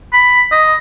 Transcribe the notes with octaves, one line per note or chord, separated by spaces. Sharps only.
B5
D#5